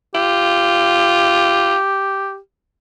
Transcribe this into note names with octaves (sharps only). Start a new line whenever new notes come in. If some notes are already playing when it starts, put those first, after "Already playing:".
F4 G4